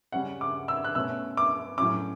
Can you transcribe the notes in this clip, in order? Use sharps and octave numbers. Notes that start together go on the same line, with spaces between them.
C#3 G3 C#4 F#5
D6
E6
F#6
B2 A3 C#4 E6
D6
A2 F#3 C#4 D6